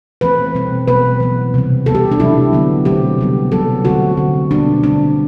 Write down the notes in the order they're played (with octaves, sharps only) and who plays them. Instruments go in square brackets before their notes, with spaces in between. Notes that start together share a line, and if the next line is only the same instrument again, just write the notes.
[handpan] E3 A3 C4 B4
B2 G3 C4
B2 F#3 B3 B4
E3 B3
C3 G3 C4
E3 G3 B3 A4
G4
D4
C3 F#3 A3 E4
D3 F#3 B3
B2 F#3 A3 C4 G4
C3 G3 B3
C3 F#3 B3 A4
D3 A3 C4 F#4
D3 A3 C4
B2 G3 B3 D4
D3 G3 C4 D4